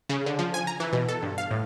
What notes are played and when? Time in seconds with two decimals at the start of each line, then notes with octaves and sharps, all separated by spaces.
0.09 C#3
0.26 D3
0.39 F3
0.54 G#5
0.67 A#5
0.80 E3
0.93 B2
1.09 A4
1.23 G2
1.38 F5
1.51 A2